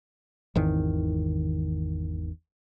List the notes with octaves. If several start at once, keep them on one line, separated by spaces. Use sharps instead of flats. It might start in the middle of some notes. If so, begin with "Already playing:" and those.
G#1 E2 D#3